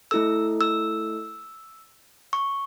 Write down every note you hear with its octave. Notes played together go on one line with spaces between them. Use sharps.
A3 E4 A4 E6
E6
C#6